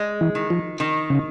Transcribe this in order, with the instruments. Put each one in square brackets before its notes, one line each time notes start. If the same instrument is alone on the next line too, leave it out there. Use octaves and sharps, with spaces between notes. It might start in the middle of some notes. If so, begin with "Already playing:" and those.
Already playing: [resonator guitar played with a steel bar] G#3
[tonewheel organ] E3
[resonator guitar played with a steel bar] D#3
[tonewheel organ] F3
[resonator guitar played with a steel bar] D#3
[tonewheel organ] C#3